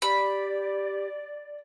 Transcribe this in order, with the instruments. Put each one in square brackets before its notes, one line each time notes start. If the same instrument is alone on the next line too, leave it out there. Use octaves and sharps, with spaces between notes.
[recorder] G4 [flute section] D5 [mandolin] B5